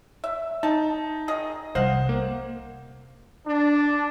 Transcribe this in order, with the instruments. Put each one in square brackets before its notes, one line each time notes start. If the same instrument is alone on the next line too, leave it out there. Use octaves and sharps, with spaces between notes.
[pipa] E5
[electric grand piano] D#4 [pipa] A5
[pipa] D#3 G#4 D#5
[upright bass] C2 [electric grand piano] C5 [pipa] D#5 F5 F#5
[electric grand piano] A#3
[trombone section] D4